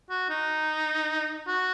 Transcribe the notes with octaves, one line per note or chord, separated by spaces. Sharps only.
F#4
D#4
F#4